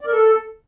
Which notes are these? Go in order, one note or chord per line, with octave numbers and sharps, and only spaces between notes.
D5
A#4
A4